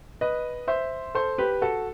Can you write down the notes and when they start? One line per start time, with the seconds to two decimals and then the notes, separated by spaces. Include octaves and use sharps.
0.21 B4 D#5
0.68 C5 E5
1.15 A4 C5
1.38 G4 B4
1.62 F#4 A4